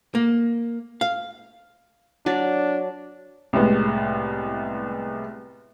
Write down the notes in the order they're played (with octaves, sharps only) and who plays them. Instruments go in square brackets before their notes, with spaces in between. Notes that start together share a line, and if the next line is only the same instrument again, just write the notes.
[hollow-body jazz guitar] A#3
F5
[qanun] F#3 D5 [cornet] D4
[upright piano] C2 A2 G#3 B3